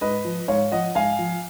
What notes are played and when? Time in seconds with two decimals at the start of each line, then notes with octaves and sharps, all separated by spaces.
0.01 G#2 B4 D#5
0.25 F3
0.48 G#2 C#5 F5
0.72 F3 D#5 F#5
0.95 G#2 F5 G#5
1.19 F3